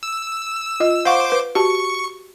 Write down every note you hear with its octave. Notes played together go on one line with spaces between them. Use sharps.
E6
F4 D#5
C5 F5 F#5 C#6 D6
B4
F#4 G4 A5 C#6